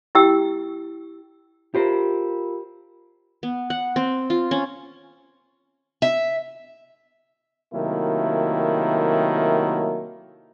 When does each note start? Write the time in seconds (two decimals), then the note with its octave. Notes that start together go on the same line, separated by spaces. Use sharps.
0.15 E4 G4 G5 E6
1.75 F4 G4 A#4 C5
3.43 B3
3.70 F#5
3.96 C4
4.30 F4
4.51 C#4
6.02 E5
7.72 C3 D#3 F#3 A3 A#3 E4